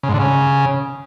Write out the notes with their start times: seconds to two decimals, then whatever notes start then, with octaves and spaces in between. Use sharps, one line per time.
0.03 C#3
0.09 G#2
0.14 D3
0.19 C#3